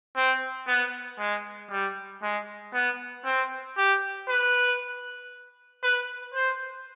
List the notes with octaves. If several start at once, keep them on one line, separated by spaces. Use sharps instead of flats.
C4
B3
G#3
G3
G#3
B3
C4
G4
B4
B4
C5